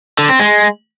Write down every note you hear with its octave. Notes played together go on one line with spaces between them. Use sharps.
D3
C4
G#3